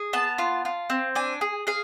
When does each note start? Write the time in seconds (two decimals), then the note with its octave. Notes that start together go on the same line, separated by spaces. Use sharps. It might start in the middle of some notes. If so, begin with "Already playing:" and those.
Already playing: G#4
0.13 B3 A5
0.38 F4
0.65 F4
0.90 C4
1.15 D4 G#5
1.41 G#4
1.67 G#4 F5